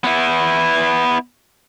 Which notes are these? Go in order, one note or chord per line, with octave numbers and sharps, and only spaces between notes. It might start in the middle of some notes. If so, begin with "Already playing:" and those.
B3 E4